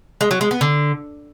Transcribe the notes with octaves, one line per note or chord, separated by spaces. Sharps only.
G#3
F#3
G#3
B3
D3